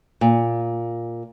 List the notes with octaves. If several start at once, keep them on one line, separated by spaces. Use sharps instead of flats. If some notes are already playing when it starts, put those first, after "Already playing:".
A#2